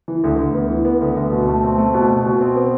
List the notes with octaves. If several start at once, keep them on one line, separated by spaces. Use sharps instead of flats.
E3
D2
D2
B3
E3
B3
D2
D2
B2
A3
C4
A3
B2
B2
B2
C4
B3